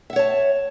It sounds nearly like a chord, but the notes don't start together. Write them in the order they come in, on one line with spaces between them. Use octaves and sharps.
E5 F#5 C#5 A5